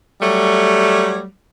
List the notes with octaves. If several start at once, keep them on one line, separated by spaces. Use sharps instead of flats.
F#3 G3 A3